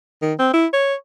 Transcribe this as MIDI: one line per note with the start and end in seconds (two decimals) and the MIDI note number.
0.22 0.34 51
0.39 0.49 60
0.53 0.66 64
0.73 0.94 73